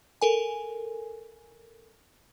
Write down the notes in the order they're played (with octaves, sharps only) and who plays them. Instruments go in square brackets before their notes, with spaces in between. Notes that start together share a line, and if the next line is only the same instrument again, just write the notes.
[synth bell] A4 A#4 G#5